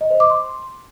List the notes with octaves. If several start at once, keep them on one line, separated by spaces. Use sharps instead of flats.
D#5
C5
D6
C6